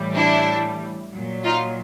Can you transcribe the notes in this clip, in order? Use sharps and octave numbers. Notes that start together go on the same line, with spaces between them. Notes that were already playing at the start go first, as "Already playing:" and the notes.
Already playing: A2 E3 G3
D4 E4
A#2 F#3
D#4 F4